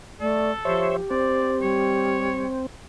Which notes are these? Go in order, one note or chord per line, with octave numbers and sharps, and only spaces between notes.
A3 A4 D5
F3 G4 C5 C#5 E5
C4 C5 D5
G3 C#5